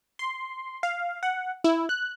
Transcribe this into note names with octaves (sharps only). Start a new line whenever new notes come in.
C6
F5
F#5
E4
F#6